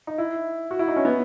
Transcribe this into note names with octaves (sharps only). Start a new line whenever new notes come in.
D#4
E4
F#4
E4
D#4
C#4
B3